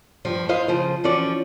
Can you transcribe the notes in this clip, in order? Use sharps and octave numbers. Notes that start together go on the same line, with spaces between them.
G2 F3 G3
E4 F4 C5 D#5 F5
C#3 F3 C5
E3 F3 C#4 F#4 D5